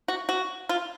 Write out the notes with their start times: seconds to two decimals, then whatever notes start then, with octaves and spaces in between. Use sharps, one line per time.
0.08 F#4
0.29 F#4
0.69 F4